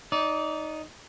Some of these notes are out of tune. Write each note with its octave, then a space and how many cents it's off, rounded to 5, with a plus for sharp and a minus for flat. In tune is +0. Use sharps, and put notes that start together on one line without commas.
D#4 +0 D5 -25